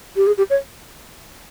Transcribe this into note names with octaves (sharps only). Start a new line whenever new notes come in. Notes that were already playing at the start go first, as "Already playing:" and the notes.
G4
G#4
G4
C#5